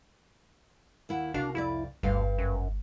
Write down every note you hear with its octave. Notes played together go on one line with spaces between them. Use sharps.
D#2 E4 F#5
C2 D4 F#4 A#4 F5
F2 E4 G#4 D5
G1 D2 G2 F5
F#2